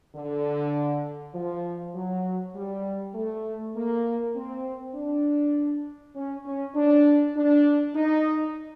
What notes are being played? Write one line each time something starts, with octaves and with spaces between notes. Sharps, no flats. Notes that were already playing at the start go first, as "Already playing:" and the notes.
D3
F3
F#3
G3
A3
A#3
C4
D4
C#4
C#4
D4
D4
D#4